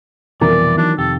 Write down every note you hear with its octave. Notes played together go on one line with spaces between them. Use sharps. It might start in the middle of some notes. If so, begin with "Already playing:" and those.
C2 F2 B2 E3 B3 A#4 D5
D#3 E3 F#3 D4
F2 C3 G4 A4